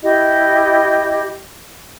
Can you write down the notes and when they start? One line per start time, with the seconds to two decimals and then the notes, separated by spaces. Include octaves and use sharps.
0.03 E4 G4 D#5